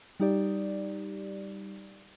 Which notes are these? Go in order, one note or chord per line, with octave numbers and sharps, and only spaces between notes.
G3 D#4 G4 D5